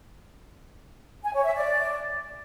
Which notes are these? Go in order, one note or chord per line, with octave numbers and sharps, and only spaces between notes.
G#5
C#5
E5
D5